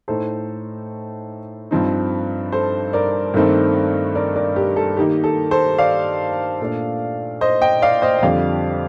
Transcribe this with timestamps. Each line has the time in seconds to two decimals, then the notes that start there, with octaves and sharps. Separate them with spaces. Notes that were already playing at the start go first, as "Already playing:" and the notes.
0.08 A2 A3 D#4 A4 C5
1.71 G2 F3 C4 D#4
2.52 A4 C5
2.93 A#4 D5
3.34 G2 D#3 A3 C4 D#4
4.15 A#4 D5
4.36 A#4 D5
4.56 G4 A#4
4.76 A4
4.97 D#3 A#3 D#4 G4
5.24 A4
5.51 A4 C5
5.79 D5 F5
6.60 A#2 A3 D4
7.41 C5 D#5
7.62 D#5 G5
7.82 D5 F5
8.02 C5 D#5
8.19 D#5
8.23 F2 D3 G3 C4 D5 F5